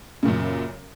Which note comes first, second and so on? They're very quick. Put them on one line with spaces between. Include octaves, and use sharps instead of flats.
C#3 A#2 F#2